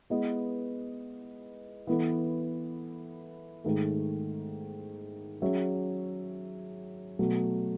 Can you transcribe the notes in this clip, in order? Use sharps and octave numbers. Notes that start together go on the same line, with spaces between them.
G#3 B3 E4 B4 D#5
E3 B3 E4 A4
G#2 D#3 A3
F#3 C#4 G#4 C#5 E5
B2 F#3 A3